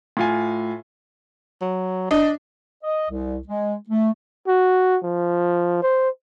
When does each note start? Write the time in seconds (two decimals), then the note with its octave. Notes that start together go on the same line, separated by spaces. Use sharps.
0.17 A2 F4 G#5
1.61 F#3
2.11 D4 D#5
2.84 D#5
3.10 C2
3.48 G#3
3.89 A3
4.48 F#4
5.04 F3
5.82 C5